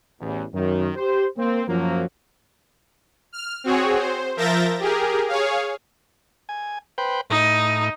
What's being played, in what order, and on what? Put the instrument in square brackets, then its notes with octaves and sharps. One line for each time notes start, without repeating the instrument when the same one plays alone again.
[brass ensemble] A1 E2
F#2 D#3
G4 C5
A#3 C4
F#2 F3 F#3 A#3
[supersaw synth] F6
C4 F#4 G#4 C#5
C5
F3 A#4 E5 G6 A6 A#6
G4 G#4 A#4
G#4 C#5 F5
[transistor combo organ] G#5
B4 C5 G5
[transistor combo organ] A2 [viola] D#4